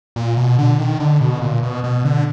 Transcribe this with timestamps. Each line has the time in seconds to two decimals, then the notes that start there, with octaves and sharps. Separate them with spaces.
0.16 A#2
0.37 B2
0.59 D3
0.79 D#3
1.00 D3
1.21 B2
1.41 A#2
1.63 B2
1.84 B2
2.05 D3